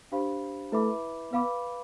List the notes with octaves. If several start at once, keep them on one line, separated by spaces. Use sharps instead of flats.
D4 G4 C5 F5 B5
A3 E4 B4 E5 B5 D6
B3 B4 F5 B5 D6